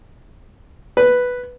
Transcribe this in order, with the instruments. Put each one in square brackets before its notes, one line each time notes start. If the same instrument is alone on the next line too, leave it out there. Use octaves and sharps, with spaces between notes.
[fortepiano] B4